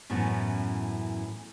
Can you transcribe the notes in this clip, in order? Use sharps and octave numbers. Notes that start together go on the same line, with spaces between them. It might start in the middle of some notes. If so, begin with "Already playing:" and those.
F#2 A2 E3 A3 B3 C#4